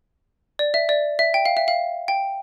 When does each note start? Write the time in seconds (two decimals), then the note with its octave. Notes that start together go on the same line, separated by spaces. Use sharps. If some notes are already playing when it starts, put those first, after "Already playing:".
0.59 D5
0.74 E5
0.89 D5
1.19 E5
1.34 G5
1.46 F5
1.57 E5
1.68 F5
2.08 G5